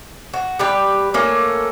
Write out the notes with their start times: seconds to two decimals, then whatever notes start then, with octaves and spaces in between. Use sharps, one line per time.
0.34 F#4
0.59 G3 G4 B4
1.14 A3 A#3 C#4